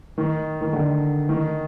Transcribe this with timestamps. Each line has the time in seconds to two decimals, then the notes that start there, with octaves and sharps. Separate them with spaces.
0.18 D#3
0.61 D#3
0.73 D3
1.29 D#3